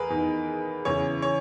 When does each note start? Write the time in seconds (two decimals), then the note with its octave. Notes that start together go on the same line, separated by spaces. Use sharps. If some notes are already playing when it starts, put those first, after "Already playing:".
Already playing: E2 G#4 A#4 B4
0.10 E2 D#3
0.85 E2 C#3 E3 C#5
1.22 C#5